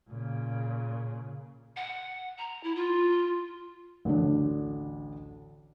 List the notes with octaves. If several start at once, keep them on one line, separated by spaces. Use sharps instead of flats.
A#2 C#3
F#5
A#5
E4
F4
A1 D2 D4